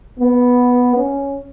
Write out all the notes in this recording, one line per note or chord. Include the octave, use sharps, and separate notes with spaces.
B3
C#4